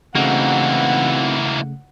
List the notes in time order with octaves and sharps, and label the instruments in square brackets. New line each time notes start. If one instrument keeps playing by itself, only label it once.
[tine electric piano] C#3 A3 [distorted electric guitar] E3 A#3 [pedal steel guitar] C4 D#4 F#4 [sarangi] F#5